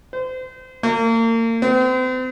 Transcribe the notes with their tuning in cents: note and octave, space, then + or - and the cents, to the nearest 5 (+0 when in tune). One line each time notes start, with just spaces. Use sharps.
C5 -30
A#3 -35
C4 -40